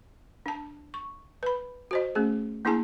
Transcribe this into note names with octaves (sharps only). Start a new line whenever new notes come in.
D4 A5
C#6
B4 B5
F#4 C5 D#5
A3 C#4 G#4
A#3 D4 E4 G#4 G#5 A5